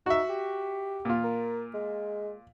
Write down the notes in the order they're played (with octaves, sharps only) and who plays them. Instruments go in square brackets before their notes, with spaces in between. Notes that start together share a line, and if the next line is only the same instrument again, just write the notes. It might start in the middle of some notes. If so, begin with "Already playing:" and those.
[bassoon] D#4 [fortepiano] F#4 E5
[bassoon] G4
[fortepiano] A#2 F4
[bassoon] A#4
G#3